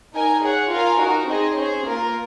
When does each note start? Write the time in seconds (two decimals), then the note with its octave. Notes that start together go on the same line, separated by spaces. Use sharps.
0.14 D#4 A#4 D#5 G#5
0.42 G#4 C#5 F#5
0.71 F4 A#4 F5 G#5
1.00 D#4 F#4 A#4
1.28 C4 D#4 G#4 D#5
1.57 C#4 G#4 C5
1.86 A#3 F4 A#4